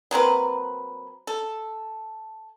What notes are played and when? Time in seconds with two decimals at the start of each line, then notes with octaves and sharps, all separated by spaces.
0.11 F#3 A#3 C4 B4
1.27 A4